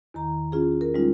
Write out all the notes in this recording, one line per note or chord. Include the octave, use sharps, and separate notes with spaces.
E2 D#3 A#5
C#4 F4 G#4
A#4
G3 G#3 C#4 D#4 F4